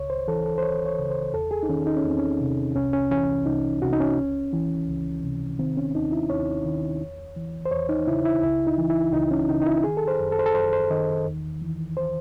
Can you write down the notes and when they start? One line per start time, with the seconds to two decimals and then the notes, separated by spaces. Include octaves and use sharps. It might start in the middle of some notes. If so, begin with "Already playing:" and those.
Already playing: C#2 C#5
0.10 C5
0.28 E3 A4
0.45 A4
0.58 C5
0.62 C#2 C#5
0.86 C#5
0.99 C#3
1.10 C5
1.34 E2 A4
1.51 G#4
1.63 D#4
1.69 D#3 C#4
1.87 D#4
1.97 C#4
2.05 E2 C4
2.18 C#4
2.41 C3
2.75 C2 C#4
2.93 C#4
3.11 E3 C#4
3.46 C2 D#4
3.82 C3 F#4
3.93 D#4
4.00 C#4
4.18 C#2
4.53 E3
4.88 C#2
5.23 C3
5.59 D#3 C4
5.77 C#4
5.95 D#2 D#4
6.12 E4
6.30 D#2 C#5
6.65 D#3
7.01 E2
7.36 E3
7.65 C5
7.71 E2 C#5
7.89 D#4
8.07 C#3 E4
8.25 E4
8.43 C#2 E4
8.67 D#4
8.78 E3
8.90 E4
9.13 C#2 D#4
9.31 C#4
9.49 C#3 D#4
9.62 D#4
9.67 E4
9.84 D#3 G#4
9.97 A4
10.08 C5
10.19 F#2
10.32 A4
10.39 C5
10.46 A4
10.54 F#2 C5
10.73 C5
10.91 D#3 D#5
11.26 E2
11.62 E3
11.97 C5